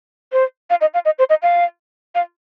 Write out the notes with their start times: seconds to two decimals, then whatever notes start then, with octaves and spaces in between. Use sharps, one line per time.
0.32 C5
0.70 F5
0.81 D#5
0.94 F5
1.05 D#5
1.19 C5
1.30 D#5
1.43 F5
2.15 F5